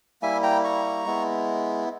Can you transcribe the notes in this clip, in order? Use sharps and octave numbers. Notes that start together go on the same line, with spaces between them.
G3 A#3 E4 E5 G#5
G5 A#5
A#5 C#6
G#3 B3 E4